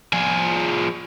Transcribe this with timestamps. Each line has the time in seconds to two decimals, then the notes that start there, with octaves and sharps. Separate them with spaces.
0.13 F3 G#4